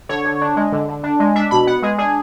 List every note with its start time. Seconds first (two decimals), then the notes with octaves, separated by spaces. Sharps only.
0.09 D3 C#5
0.25 D3
0.41 D4
0.56 G#3
0.72 D3
0.88 D3
1.03 D4
1.20 G#3
1.36 D4 E5
1.51 B2 B5
1.67 B3 F#5
1.82 G#3 G#4
1.98 D4 G#4